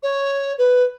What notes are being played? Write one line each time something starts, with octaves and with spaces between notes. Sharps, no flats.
C#5
B4